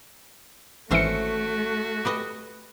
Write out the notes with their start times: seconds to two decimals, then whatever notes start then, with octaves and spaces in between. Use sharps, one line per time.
0.91 G#1 E3 A3 C#4 F#4 C5 E5 C#7
2.05 G4 B4 D#5